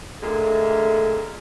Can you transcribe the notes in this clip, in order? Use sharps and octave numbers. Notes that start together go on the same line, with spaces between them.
A#2 D3 G#3 A3